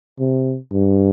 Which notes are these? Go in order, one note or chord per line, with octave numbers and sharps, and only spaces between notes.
C3
G2